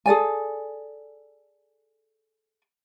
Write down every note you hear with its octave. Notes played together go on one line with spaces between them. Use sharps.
G#4 A4 D5 G#5